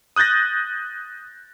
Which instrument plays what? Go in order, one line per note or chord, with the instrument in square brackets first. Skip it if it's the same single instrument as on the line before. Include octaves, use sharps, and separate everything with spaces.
[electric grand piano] D#6 F#6 G6 A6 A#6